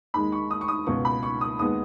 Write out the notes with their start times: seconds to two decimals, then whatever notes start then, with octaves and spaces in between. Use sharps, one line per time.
0.14 D#2 D#3 G#3 B5
0.32 C#6
0.51 D#6
0.61 C#6
0.68 D#6
0.86 C#2 B2 B3 C#6
1.05 B5
1.23 C#6
1.41 D#6
1.59 D#2 D#3 G#3 B3 D#6